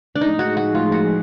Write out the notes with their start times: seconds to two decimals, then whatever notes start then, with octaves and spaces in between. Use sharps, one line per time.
0.15 D4
0.21 A2 F3 G#3 D#4
0.39 F#4
0.57 F#4
0.75 F4
0.92 F#4